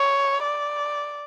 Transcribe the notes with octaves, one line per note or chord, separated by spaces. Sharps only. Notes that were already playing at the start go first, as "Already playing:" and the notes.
Already playing: C#5
D5